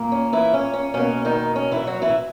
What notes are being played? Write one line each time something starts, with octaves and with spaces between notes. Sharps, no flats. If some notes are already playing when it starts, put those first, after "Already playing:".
Already playing: A#2 A#3
C#4
E3 E4
C#4
C#4
B2 A#3 C#4
D#3 D#4
C#4
E3 E4
F#3 F#4
E3 E4